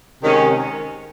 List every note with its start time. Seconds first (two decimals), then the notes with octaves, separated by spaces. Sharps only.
0.22 C3 D#3 G#3 C#4